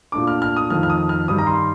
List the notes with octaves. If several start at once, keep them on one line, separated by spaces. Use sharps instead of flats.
A#2 A3 D4 D6
F6
F6
D#6
F2 D#3 A3 F6
F6
D#6
F6
G2 D#3 G3 D#6
A#5
C6